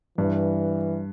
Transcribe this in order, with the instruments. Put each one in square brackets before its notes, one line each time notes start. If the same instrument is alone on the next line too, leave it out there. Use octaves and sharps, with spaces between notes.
[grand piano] G2 [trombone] E3